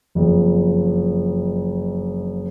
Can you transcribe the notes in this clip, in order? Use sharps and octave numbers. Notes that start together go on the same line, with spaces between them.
F#1 F2